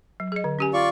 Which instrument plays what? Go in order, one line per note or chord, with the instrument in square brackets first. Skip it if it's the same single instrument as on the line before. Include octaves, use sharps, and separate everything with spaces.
[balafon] F#3
G#4 D#5
D3
C#4 G4 G#5
[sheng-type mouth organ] F4 D5 C#6